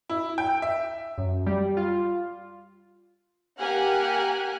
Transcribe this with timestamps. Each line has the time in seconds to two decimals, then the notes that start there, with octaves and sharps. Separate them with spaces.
0.09 E4
0.38 G5
0.62 E5
1.18 F#2
1.47 G3
1.77 F4
3.58 A#3 G4 F#5 G#5 F6 F#6